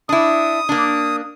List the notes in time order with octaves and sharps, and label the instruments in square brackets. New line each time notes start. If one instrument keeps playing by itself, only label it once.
[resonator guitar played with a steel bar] D4 E4 [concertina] D#6
[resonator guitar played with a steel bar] A#3 D4